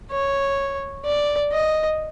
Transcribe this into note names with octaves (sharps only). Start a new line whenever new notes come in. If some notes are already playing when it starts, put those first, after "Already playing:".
C#5
D5
D#5